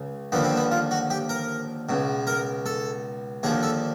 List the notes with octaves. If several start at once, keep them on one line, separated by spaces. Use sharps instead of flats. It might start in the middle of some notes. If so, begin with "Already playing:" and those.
Already playing: C#2 C#3
D#2 D3 F3 B3
C4
B3
F4
F#4
G4
A#4
C#2 B2
A#4
A4
D#2 D3 F3 G#4
A4